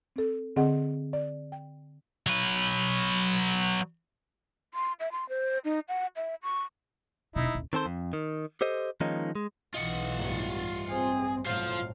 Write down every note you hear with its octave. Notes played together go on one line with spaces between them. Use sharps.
C4 A4
D3 C4 G#4 D#5 F#5
D5
G5
F#3 B4
C6
E5
C6
C5
D#4
F#5
E5
C#6
E1 B2 D#4 E4
D#1
D#3 C4 A4 C5
F2
D#3
G4 A4 C5 D#5
D#3 F3 G#3 A#3 C#4 D#4
G#3
B1 E3 F4 D#5 F#5
A1 G2 G#3
C4 G#4
B1 A2 C4 F4 C5 F5